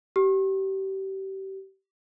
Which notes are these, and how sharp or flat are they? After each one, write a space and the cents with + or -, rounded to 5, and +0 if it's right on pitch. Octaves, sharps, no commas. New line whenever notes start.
G4 -30